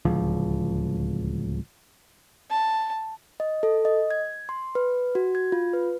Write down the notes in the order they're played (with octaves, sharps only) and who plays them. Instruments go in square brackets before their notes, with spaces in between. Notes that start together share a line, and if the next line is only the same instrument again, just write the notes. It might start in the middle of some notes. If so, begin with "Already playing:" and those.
[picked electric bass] D1 C#2 F3
[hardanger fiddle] A5
[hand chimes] D#5
A4
D#5
G#6
C6
B4
F#4
G#6
F4
B4